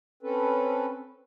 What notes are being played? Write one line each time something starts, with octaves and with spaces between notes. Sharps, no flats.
C4 C#4 A4 B4